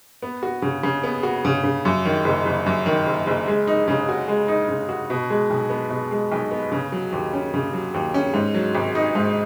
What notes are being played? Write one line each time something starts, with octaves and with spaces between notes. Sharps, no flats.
B3
F#4
C#3
C#3
B3
F#4
C#3
C#3
F#2
D#3
F#1
F#1
F#2
D#3
F#1
F#1
G#3
D#4
C#3
F#4
G#3
D#4
C#3
F#4
B2
G#3
B1
B3
B2
G#3
B1
B3
C#3
F#3
D#2
C#4
C#3
F#3
D#2
C#4
G#2
F#3
G#1
D#4
G#2